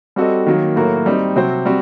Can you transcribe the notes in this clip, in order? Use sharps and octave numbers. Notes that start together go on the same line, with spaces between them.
G3 C4 F#4 A4 D#5
D#3 F#3 A#3
A2 F#3 A#3 F#4 A#4
G3 C4 D#4
C3 F#3 C4 F#4 C5
G3 C4 F#4